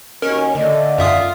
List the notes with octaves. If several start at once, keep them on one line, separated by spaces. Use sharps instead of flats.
D#2 C#4 F#4 A#4 D#5
D3 A3 D5 D#5
F#2 F4 E5 D#6